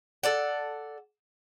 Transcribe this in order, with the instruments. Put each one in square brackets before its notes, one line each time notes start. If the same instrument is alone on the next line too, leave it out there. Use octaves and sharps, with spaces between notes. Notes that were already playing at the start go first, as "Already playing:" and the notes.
[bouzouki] A4 D5 F#5